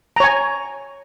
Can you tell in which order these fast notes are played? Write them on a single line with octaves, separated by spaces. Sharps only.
A#5 C#5 G#5